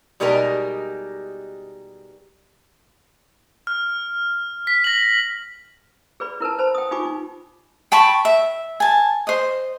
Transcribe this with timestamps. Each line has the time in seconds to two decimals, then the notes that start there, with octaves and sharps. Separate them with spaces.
0.20 B2 G3 G#3 D#4 G4 A#4
3.67 F6
4.67 B6
4.84 A#6 F#7
6.20 G#4 B4 D5 B5
6.40 E4 A#4 B4 A5
6.59 C5 A5 B5
6.75 G5 D#6
6.91 D#4 F4 G4 G#5 B5 D6
7.05 D#4
7.92 G5 A5 B5 C#6
8.25 E5
8.80 G#5 A5
9.27 C5 D#5